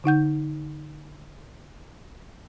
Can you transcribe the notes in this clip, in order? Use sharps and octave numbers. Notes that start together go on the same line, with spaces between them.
D3 D#4 F#5 G6